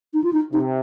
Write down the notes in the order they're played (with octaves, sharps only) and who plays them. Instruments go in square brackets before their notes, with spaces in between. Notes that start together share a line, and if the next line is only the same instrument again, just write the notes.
[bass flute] D#4
F4
D#4
[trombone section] C3 [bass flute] D#4